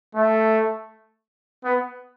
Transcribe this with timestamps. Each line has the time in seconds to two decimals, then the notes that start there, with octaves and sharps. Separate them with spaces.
0.15 A3
1.64 B3